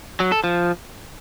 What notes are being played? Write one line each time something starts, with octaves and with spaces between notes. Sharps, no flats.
F#3
A4
F3